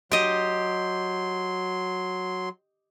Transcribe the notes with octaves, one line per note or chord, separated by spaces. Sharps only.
F#3 G4 D#5 C6